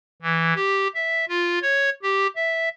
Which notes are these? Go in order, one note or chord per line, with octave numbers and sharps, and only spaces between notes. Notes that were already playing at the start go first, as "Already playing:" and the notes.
E3
G4
E5
F4
C#5
G4
E5